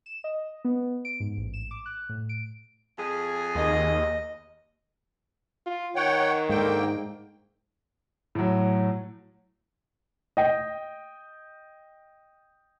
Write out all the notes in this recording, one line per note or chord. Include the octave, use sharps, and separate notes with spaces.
E7
D#5
B3
D7
G#2
A1
E7
D6
F#6
A2
D7
F2 G#4
D#2 D#5
F4
D#3 C#5 F#5 G5
G#2 D3 A#3 G5
A2 F#3
D#5 G5